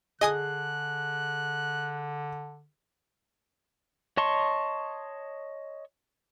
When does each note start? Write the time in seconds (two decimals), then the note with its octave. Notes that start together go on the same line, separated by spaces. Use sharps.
0.21 D3 G#4 D#5 G#5 D#6 F#6
4.17 C#5 D#5 A5 C6 C#6